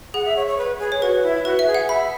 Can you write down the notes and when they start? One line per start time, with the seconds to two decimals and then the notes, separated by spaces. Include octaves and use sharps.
0.14 G#4 F#5
0.26 E5
0.36 C#5
0.47 C#5
0.58 B4
0.79 G#4
0.92 C#5
1.01 F#4 B4
1.23 E4
1.45 F#4 B4
1.59 E5
1.66 G#4
1.74 F#5
1.89 E5 B5